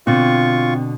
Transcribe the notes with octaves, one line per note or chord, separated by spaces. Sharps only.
B2 D3 C4 F4 C#6